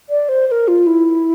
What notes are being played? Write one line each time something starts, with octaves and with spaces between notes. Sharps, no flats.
D5
C5
C5
A#4
F4
E4